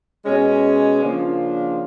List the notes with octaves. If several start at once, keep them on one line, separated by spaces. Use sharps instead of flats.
B2 G#3 C#4
C#3 F3 A#3 D4 F4